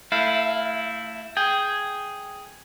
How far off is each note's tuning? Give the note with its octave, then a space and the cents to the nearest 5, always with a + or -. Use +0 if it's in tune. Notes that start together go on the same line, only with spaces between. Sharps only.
A3 +25 E4 +0 F5 +0
G#4 +0 G5 +0